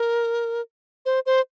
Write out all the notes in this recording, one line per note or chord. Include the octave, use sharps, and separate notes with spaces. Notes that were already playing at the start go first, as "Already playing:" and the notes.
Already playing: A#4
C5
C5